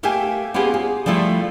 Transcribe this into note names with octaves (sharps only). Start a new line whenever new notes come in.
A3 A#3 G4 E5 G5 G#5
A#3 B3 C#4 F4 G4 G#4
G#4
F3 G3 A3 E4 F4